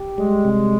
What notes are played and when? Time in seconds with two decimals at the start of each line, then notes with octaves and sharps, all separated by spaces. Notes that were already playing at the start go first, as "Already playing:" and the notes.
Already playing: G4
0.18 G3 G#3
0.45 C3